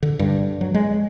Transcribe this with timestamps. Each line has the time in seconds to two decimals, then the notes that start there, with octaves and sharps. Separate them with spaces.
0.03 D3
0.19 G2
0.61 F#3
0.74 G#3